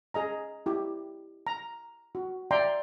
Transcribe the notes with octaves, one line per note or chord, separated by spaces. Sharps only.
G#4 D#5 A#5
E4 G4
A#5
F#4
D5 E5 G5 A#5 C6